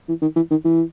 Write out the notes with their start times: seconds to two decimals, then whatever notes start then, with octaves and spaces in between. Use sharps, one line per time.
0.08 E3
0.22 D#3
0.36 E3
0.51 D#3
0.65 E3